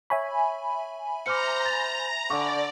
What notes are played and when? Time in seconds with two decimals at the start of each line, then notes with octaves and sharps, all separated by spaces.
0.10 C#5 E5 G#5 B5 C#6
1.26 C5 A#5 D6 F6 C#7
1.65 A6
2.30 D3 D5 C#6 D6